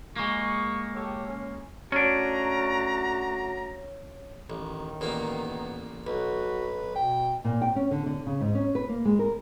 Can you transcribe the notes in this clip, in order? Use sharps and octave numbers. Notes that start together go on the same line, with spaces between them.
G#3 A#3 C#6
G4 A4 C#5
C#4
A3 C#4 D4 F#4 A#5
A1 D#3
A1 A#2 A#3 B3
B1 F#4 B4
B2 G5
A#2
G5
C#4
D3
D3
C#3
G#2
C#4
B4
A#3
G#3
A#4